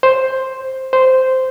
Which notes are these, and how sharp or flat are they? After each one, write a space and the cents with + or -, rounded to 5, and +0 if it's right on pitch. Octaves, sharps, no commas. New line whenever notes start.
C5 +5
C5 -10